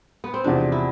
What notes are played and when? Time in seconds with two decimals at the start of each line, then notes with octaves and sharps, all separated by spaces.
0.24 B3
0.34 C4
0.44 E2 C3 F3 D4
0.72 E4